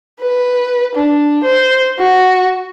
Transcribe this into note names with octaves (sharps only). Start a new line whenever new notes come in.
B4
D4
C5
F#4